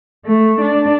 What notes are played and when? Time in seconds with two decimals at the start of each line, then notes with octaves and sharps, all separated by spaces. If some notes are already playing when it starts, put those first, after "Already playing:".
0.25 A3
0.61 D4